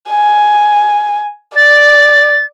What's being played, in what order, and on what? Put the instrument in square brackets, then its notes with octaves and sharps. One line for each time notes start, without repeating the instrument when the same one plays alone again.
[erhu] G#5
[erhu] D5 [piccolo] A6